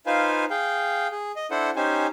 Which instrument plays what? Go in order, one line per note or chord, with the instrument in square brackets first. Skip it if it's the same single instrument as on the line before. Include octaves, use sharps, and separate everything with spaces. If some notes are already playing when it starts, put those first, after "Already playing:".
[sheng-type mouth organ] D#4 F4 B4 C5 F5 G#5
G#4 F5 G5
G#4
D#5
D4 E4 A4 C5 F#5
C#4 D#4 G4 C5 G#5